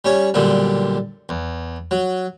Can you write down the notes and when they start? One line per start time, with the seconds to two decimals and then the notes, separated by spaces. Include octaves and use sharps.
0.05 G3 C#4 C#5
0.34 B1 A#2 D3 G3
1.29 E2
1.91 F#3